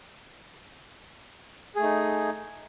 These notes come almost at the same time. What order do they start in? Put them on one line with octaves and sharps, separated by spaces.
G#4 A3 D#4